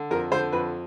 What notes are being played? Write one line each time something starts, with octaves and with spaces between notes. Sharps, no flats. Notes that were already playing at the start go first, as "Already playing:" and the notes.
Already playing: D3
F2 A#4
D3 C5
F2 B4